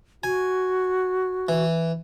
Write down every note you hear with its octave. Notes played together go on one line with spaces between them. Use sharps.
F#4 G#5
E3